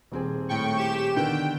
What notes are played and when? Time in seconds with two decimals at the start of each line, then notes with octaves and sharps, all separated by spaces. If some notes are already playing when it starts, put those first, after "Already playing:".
0.12 D#1 C4 G#4
0.49 A2 G5 C#6
0.78 G4 E7
1.16 D3 D#3 B3 G5